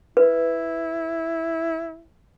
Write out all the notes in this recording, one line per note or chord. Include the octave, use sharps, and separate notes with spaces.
E4 B4